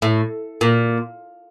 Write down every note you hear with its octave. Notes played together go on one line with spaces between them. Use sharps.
A2
A#2